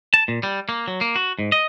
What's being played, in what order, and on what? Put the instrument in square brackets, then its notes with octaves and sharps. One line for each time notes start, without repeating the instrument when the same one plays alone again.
[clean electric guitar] A5
A#2
G3
A#3
F#3
A#3
F#4
G#2
D#5